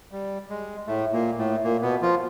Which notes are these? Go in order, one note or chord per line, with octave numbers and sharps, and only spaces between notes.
G3
G#3
A2 A3
A#2 A#3
A2 A3
A#2 A#3
B2 B3
F3 F4